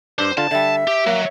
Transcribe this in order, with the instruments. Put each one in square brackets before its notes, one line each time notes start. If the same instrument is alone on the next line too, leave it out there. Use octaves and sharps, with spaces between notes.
[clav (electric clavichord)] G2 D4 [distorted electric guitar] C5
[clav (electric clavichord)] D3 F4 [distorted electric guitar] A5
[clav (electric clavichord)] D3 G3 [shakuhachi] E5
[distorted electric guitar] G4
[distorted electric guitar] F#3 [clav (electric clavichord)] A#3